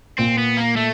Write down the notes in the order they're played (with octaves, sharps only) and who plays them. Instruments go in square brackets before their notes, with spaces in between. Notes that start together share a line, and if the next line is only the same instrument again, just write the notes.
[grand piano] A#2 [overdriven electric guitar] C4
[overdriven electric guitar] B3
A#3
A3